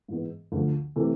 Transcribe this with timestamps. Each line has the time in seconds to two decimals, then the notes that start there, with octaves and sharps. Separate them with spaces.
0.08 G#2 E3 B3
0.52 D2 D3 F3
0.96 C3 E3 A3